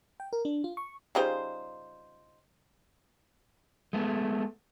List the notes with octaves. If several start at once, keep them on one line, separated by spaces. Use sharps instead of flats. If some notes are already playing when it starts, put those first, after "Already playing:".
G5
A#4
D4
F4
C#6
C#3 G3 D#4 F4 C5
G#3 A3 B3